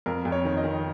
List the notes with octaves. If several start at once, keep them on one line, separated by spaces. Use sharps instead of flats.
F2 A#4
F2
C#5
D#3
D#5
D#3